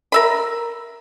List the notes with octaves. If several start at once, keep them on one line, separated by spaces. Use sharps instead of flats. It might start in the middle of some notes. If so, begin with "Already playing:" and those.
A#4 E5 B5